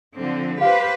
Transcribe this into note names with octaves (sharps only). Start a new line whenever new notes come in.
D3 F3 C4
G4 B4 C5 F5